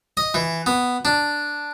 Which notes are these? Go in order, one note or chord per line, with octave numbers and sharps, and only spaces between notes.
D#5
E3
B3
D4